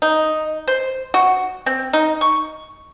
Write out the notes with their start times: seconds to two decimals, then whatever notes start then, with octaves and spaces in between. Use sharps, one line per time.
0.02 D#4
0.68 C5
1.14 F#4
1.66 C4
1.93 D#4
2.21 C#6